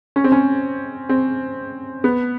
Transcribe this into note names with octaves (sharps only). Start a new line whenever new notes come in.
C#4
C4
C#4
C4
B3